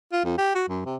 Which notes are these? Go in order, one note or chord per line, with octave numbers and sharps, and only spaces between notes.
F4
F2
G4
F#4
F#2
C3